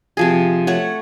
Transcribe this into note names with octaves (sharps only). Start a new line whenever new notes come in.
C3 F3 G#4
A3 C#5 F#5